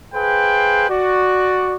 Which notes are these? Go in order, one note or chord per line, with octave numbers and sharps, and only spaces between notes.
G#4 B4 C5 F5 G5
F#4 D5